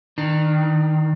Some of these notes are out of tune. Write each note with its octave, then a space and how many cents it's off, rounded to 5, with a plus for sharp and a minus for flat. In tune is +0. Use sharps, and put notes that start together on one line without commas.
D#3 +0 D4 +35